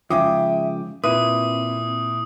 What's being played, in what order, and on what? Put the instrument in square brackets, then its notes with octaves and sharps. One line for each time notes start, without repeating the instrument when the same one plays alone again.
[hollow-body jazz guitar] G#2 C#3 F3 [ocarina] E5 [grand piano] G5 D6 D#6
[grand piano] A#2 E4 D#7 [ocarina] C4 [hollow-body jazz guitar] B4 [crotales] D#6